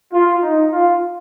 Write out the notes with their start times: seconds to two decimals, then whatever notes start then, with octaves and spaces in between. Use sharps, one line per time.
0.12 F4
0.43 D#4
0.73 F4